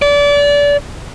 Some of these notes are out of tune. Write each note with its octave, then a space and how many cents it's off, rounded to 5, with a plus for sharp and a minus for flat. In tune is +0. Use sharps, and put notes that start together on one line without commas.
D5 -30